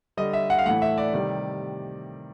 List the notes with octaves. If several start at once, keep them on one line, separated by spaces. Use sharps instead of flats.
D3 G3 D#5
E5
F#5
F5
A2 E3 A3 F#5
E5
D5
C3 D#3 G3